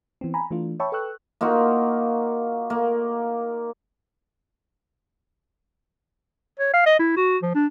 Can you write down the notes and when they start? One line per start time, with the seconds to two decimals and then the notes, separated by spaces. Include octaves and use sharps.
0.21 E3 B3 C4
0.34 G#5 A#5 B5
0.51 E3 A3 D4 F4
0.80 C#5 E5 G5 A5 B5 C#6
0.92 A4 B4 G5 C#6 E6 F#6
1.41 A#3 D#4 F4 F#4
2.70 A#3
6.59 C#5
6.73 F5
6.86 D#5
6.99 E4
7.17 F#4
7.43 F3
7.55 D4